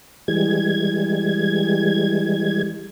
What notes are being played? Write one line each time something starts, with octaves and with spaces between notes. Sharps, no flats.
E3 G3 G#3 G#6